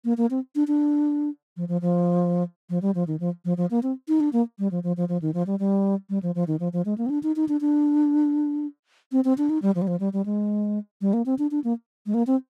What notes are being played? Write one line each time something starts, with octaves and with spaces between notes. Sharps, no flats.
A#3
A#3
C4
D4
D4
F3
F3
F3
F3
G3
F3
D#3
F3
F3
F3
A#3
C4
D#4
D4
A#3
G3
F3
F3
F3
F3
D#3
F3
G3
G3
G3
F3
F3
D#3
F3
F3
G#3
A#3
C4
D4
D#4
D#4
D4
D4
C4
C4
D4
D#4
G3
F3
G3
F3
G3
G3
G#3
G3
A#3
C4
D4
D4
A#3
G#3
A#3
C4